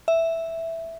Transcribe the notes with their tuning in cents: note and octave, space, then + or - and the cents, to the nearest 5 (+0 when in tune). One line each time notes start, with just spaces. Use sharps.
E5 +0